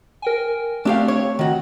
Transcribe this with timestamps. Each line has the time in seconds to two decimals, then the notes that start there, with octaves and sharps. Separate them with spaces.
0.22 A#4 G5 G#5
0.85 A3 C4 D4 G4 F5
1.08 C#5
1.39 D#3 F#4